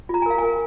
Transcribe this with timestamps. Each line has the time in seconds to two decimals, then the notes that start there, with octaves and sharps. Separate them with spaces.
0.09 F4 A#5
0.22 G#5
0.26 A#4 F5
0.38 A#4 G#5